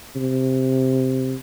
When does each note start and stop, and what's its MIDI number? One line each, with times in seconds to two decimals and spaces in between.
0.16 1.35 48